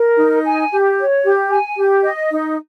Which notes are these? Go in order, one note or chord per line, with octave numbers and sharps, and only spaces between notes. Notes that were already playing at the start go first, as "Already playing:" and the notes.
Already playing: A#4
D#4
G#5
G4
C#5
G4
G#5
G4
D#5
D#4